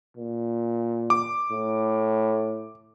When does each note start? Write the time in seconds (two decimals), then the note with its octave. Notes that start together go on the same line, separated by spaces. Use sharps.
0.17 A#2
1.10 D6
1.51 A2